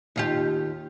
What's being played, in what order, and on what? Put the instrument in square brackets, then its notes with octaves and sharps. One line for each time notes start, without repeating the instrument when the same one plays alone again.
[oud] D#2 F4 G4